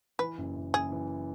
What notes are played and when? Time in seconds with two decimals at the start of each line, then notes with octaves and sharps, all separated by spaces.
0.19 E3 B4
0.38 F#1
0.55 F#1
0.73 F#1 G#4
0.92 E3